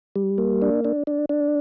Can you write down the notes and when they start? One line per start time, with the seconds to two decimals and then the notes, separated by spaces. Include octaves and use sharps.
0.16 G3
0.38 A#3
0.62 D4
0.85 D4
1.07 D4
1.29 D4